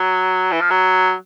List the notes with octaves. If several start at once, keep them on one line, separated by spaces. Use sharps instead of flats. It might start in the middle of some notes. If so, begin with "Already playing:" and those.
Already playing: F#3
E3
F3
F#3